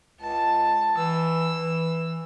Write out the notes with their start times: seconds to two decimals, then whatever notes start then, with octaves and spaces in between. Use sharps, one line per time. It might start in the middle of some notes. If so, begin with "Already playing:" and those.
0.19 C#2 A5
0.97 E3 E6
1.58 E3